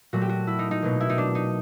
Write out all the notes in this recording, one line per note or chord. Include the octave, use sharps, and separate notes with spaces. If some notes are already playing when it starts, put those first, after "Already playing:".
A#2 F#3 A3 F#4
G4
F#4
E4
D#4
D#4
B2 F#3 A#3
E4
D#4
D4
D#4